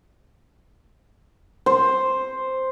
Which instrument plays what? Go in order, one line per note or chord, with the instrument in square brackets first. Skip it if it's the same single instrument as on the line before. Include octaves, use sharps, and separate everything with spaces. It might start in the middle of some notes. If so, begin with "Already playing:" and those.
[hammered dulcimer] C5